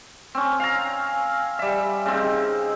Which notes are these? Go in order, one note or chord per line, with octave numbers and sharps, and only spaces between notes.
C4 C#4
F5 G#5 A#5
G3 E5
C#3 C4 D#4